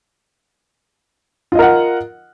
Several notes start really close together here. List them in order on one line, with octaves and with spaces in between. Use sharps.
F4 D#5 A#4 F#5